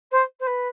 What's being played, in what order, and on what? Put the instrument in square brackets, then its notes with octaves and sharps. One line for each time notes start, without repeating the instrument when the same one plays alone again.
[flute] C5
C5
B4